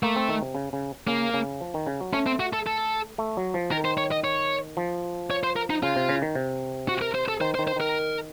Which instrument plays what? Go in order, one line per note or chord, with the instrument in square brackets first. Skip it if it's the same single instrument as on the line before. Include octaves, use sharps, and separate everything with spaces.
[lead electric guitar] A3 [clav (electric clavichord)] A#3
[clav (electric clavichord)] C4
D#3
C3
C#3
C#3
[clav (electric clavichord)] C#3 [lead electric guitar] A#3
[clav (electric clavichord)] C#3
F3
D#3
C#3
F#3
[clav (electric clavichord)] A3 [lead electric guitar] C#4
[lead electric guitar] C4
F#4
A4
A4
[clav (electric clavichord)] A3
F#3
F3
[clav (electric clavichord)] D#3 [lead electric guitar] A#4
[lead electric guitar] C5
C#5
D#5
C#5
[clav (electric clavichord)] F3
[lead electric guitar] C#5
C5
A#4
D#4
[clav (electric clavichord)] C#3 [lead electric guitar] F4
[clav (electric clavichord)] C3
C#3
D#3
C3
[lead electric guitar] F#4
A#4
C5
A4
[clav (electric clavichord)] D#3 [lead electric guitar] C5
[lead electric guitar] C5
[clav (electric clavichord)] D#3
[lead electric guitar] C5
[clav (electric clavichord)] D#3 [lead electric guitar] A#4